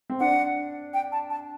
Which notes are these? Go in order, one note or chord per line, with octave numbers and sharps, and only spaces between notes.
C4
D4 F#5
G5
A5
A5